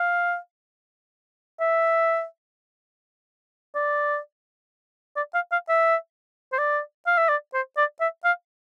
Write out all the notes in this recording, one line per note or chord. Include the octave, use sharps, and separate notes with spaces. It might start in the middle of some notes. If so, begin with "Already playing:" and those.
Already playing: F5
E5
D5
D5
F5
F5
E5
C5
D5
F5
E5
D5
C5
D5
E5
F5